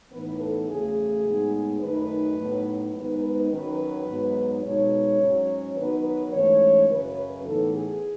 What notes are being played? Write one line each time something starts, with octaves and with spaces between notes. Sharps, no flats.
A2 E3 B3 D#4 B4
A4
E2 C#3 F#3 A3 G#4
A2 G#3 B3 D#4
F#2 D#3 A3 D#4 B4
A2 F#3 B3 D#4
G#2 D#3 G#3 B3 D#4 B4
B4
D#3 F#3 C#4 B4
G#2 F#3 B3 D#4
B2 G#3 D#4 C#5
G#2 F#3 C#4
D#3 F#3 B3 D#4 B4
B4
G#2 E3 A3 C#4 C#5
F#2 C#3 F#3 C#4 B4
A2 E3 B3 D#4 A4
G#4